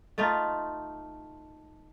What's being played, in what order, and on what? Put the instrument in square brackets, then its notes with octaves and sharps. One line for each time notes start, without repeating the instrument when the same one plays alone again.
[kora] A3 D#4 F4